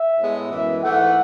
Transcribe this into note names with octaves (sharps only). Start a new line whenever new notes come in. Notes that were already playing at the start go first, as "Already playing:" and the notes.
Already playing: E5
A2 G#3 B3
F#2 E3 G#3 B3 E5
G#2 E3 A3 F#5